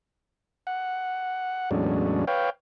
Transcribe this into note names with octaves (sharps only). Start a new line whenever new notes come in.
F#5
E2 A2 F#3 G#3 C#4 D4
B4 C#5 F5 G5